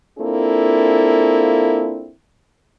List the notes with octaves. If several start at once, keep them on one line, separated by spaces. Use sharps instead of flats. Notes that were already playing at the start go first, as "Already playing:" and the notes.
A#3 C4 D4 E4 F4 A4